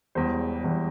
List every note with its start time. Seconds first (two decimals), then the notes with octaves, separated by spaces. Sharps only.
0.15 E1 E2 E3 G3 C5
0.63 E1 E2 E3 G3